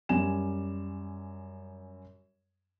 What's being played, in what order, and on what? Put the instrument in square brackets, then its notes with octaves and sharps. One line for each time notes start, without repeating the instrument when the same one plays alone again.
[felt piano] F#2 G3 G#5 E7